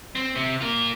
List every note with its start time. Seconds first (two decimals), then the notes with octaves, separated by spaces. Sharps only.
0.15 C4
0.36 C3
0.61 F4 A#4